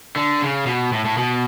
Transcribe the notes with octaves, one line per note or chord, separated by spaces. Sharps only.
D3
C#3
B2
A2
A2
B2